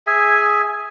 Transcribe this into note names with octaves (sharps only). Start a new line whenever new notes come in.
G#4 E5 G#5